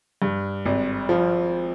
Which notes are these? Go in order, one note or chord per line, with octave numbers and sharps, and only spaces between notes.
G2
G#1
F3